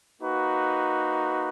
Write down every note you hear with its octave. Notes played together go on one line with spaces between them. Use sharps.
A#3 D#4 F#4 B4